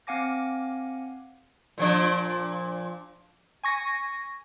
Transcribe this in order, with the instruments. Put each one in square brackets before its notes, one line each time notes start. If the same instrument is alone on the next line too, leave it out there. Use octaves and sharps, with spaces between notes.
[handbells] C4 F5 F#5 G#5 D6 A#6
[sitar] A#2 F3 D4
[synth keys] G#5 C#6 A#6